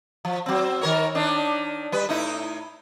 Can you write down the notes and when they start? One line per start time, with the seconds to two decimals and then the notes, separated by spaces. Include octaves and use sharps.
0.25 F3
0.46 F#3 C4
0.81 D#3 A#4 C#5
1.15 D#3 D4
1.92 G3 B4
2.09 A2 D#4 E4